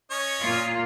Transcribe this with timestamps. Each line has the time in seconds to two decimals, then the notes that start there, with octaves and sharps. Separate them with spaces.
0.11 C#4 C#5 D#5
0.41 A#2 A#3 F4